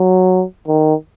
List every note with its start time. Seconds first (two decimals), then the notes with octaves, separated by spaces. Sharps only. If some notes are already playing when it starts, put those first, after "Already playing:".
Already playing: F#3
0.68 D#3